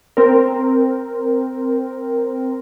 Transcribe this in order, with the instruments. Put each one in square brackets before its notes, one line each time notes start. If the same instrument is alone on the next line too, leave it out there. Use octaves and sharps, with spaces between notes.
[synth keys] C4 A#4